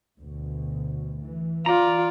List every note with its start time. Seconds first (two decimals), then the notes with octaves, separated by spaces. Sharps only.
0.19 D2 B2
1.21 E3
1.66 F4 D5 A#5